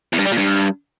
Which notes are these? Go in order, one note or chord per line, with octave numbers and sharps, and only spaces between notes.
E2
G2
G3
A#2
G2